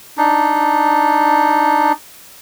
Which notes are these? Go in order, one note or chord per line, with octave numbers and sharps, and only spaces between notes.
D4 D#4